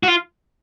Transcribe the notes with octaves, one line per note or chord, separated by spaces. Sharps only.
F#4
F4